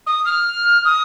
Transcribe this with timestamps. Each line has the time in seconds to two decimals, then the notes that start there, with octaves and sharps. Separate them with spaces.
0.06 D#6
0.25 F6
0.85 D#6